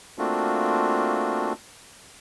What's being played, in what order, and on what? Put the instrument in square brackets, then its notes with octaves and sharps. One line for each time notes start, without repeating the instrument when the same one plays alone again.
[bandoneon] A3 A#3 C4 D4 F4 F#4